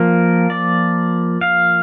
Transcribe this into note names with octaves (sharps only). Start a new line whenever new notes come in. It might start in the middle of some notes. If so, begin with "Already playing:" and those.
Already playing: F3 A#3 A#4
D5
F5